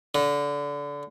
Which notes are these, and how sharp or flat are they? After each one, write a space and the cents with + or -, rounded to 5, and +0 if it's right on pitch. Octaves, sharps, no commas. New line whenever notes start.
D3 -25